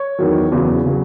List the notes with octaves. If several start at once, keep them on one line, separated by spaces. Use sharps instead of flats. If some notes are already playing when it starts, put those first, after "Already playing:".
Already playing: C#5
E2 D#3 F#3
E2 C#3 F#3
C#3 F#3